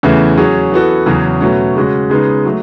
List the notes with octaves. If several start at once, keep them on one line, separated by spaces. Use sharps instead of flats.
E2 C#3 E3 A3
F#3 C#4 G#4
E3 B3 F#4 A4
E2 C#3 F#3 C#4 G#4
B2 F#3 A3 C#4
C#3 G#3 C#4 F#4
C#3 G#3 B3 D#4
F#3 A3